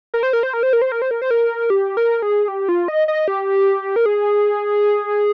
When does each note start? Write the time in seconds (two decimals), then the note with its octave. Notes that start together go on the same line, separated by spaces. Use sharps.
0.14 A#4
0.23 C5
0.33 A#4
0.43 C5
0.53 A#4
0.63 C5
0.73 A#4
0.82 C5
0.92 A#4
1.02 C5
1.11 A#4
1.22 C5
1.31 A#4
1.70 G4
1.97 A#4
2.22 G#4
2.48 G4
2.69 F4
2.88 D#5
3.08 D#5
3.28 G4
3.96 A#4
4.06 G#4